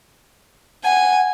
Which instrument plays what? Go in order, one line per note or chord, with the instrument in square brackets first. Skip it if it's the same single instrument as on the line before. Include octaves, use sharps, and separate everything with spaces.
[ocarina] F#5 [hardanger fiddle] G#5